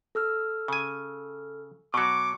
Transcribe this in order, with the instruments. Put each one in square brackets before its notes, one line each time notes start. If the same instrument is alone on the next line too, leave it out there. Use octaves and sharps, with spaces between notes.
[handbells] A4 E6 F6
[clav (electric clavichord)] C#3 G#5
[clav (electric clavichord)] B2 F#3 [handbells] C#6 C#7 [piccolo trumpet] D6